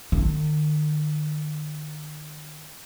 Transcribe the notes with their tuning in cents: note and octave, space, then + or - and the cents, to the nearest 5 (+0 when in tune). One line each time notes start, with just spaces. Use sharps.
D#3 -45